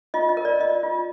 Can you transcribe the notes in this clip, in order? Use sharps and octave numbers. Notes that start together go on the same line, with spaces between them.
F4 D#5
D#5
A#4
D5
F4 D#5
F4